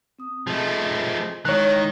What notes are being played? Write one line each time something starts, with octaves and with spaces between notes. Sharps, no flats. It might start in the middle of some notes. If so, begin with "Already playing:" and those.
C4 D#6
F3 A3 G#4 D#5
D#3 G#3 E4 C#5 F#6